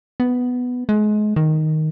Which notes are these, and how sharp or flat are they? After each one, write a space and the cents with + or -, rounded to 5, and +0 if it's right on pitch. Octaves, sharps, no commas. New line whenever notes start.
B3 +5
G#3 +30
D#3 +0